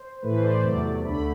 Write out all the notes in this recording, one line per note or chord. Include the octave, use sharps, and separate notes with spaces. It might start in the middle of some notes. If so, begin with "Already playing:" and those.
Already playing: C5
A2 E3 A3 B4
C5
D5
C5
E2 C3 F#3 A3 D5
D2 D3 A3 B5